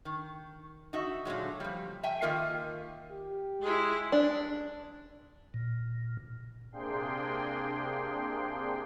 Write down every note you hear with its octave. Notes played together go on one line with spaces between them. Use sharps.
D#3
D#4 F#4 E5
A#2 D3 F#3 G#3
F3 G3
E5 G5 G#5
D#3 A#3 F4 A#4 E5 G5
G4
G#3 E4 G#4
D4
A#2
C3 A#3 D4 G#4 G5 C6